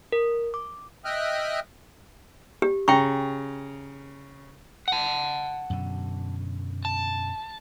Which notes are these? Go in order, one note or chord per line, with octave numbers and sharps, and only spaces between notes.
A#4
D6
D#5 E5 G5 D#6 F6 F#6
G4
C#3 G5 A#5 C#6
F#5 A5
F#2 B2 D3
A5